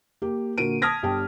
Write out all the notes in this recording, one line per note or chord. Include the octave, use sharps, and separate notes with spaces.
A#3 G4
A#2 D3 F#4 A#4 D7 D#7
A5 D#6 F6 G#6 A#6 B6
G1 D4 G4 G5 A5